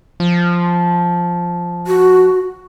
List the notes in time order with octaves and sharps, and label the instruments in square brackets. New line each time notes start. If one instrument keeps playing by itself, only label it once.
[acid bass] F3
[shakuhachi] F#4